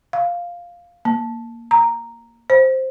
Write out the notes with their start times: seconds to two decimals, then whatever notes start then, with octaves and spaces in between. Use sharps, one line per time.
0.13 F5
1.05 A#3
1.71 A#5
2.50 C5